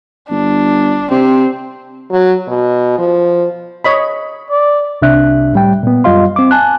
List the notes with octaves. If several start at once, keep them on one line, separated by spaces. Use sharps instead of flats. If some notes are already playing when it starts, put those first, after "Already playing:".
G1 D4
C3 C4
F#3
B2
F3
C#5 D#5 B5
D5
C2 C3 D4 E5 F#6
A2 G3 G5
A#2 B3
F#2 G3 F4 D#5 F5 C6
C4 D6
G#5 A5 F#6